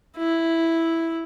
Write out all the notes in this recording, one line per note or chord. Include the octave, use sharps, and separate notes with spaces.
E4